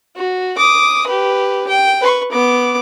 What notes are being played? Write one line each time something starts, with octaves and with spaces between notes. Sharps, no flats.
F#4
D6 D#6
G4 B4
G5
B4 C#6
B3 D6